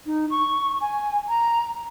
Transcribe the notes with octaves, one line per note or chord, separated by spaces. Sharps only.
D#4
C#6
G#5
A#5